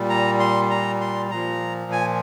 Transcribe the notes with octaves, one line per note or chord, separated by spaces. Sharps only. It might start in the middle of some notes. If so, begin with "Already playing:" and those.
Already playing: A#2 G3
A#5
C6
A#5
C6
A#2 F3 A#5
G#5